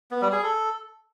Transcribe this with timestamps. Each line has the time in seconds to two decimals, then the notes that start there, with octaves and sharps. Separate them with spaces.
0.11 B3
0.22 G3
0.32 G#4
0.43 A4